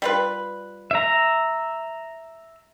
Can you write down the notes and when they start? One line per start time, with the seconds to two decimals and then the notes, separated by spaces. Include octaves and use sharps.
0.02 G3 F4 B4
0.91 E5 A#5